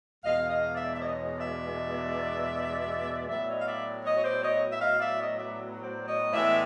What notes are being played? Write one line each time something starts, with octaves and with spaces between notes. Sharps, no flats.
E2 B2 G#3 D#5 F5
D#5 F5
D5 E5
E5
C#5 D#5
D5 E5
A2 F#3 B3 D5 E5
C#5 D#5
F5
D5 E5
C#5 D#5
C#5
C5 D5
C#5 D#5
E5
D#5 F5
D5 E5
C#5 D#5
D5 E5
C5 D5
C#5 D#5
A2 E3 G#3 B3 D5 E5